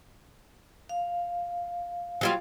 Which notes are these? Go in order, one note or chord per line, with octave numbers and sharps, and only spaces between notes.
F5
F#3 G3 F4